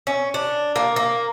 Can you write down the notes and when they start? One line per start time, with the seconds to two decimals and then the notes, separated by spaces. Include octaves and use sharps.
0.07 C#4
0.34 D4
0.76 A#3
0.96 A#3